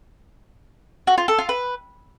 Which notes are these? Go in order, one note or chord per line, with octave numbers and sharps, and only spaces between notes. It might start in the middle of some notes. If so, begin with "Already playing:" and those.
F#4
F4
A4
F4
B4